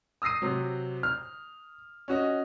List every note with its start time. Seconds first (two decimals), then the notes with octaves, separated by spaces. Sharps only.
0.22 D#6 E6 A#6 C7 D#7
0.42 C3 F#3
1.03 F6
2.08 C#4 F#4 D#5